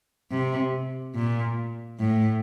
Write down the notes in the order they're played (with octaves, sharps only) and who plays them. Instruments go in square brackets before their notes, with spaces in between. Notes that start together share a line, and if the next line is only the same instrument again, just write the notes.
[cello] C3
A#2
A2